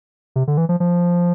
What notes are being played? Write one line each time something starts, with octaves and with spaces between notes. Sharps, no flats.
C3
D3
E3
F3
F3